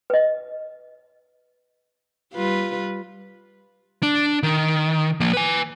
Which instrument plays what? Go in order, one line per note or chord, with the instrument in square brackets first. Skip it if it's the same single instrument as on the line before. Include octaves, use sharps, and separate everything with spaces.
[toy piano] B4 D#5
[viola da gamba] G3 F4 B4
[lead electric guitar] D4
D#3
F3 A#3
B4 G#5